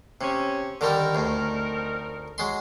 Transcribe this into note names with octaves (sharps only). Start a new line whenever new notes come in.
C3 C#4
D3 D#3 G3 C4 D#4 A#4
D2 A2
F#3 G#3 C6